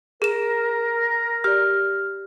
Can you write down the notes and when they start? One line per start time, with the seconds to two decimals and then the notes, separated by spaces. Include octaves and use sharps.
0.22 G#4 A#4 E7
1.44 G4 D5 F6